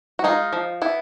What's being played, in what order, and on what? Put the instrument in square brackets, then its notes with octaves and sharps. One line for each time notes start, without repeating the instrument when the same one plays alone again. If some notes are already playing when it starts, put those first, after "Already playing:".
[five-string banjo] F#4
G#3 D#4 F4
F3
B3 E4